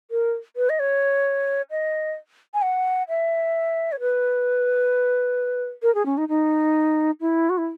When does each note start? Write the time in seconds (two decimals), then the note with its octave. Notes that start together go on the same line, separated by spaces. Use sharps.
0.11 A#4
0.56 B4
0.69 D#5
0.79 C#5
1.71 D#5
2.54 G#5
2.62 F#5
3.08 E5
3.92 C#5
4.00 B4
5.82 A#4
5.95 G#4
6.06 C#4
6.17 D#4
6.29 D#4
7.21 E4
7.50 F#4
7.58 E4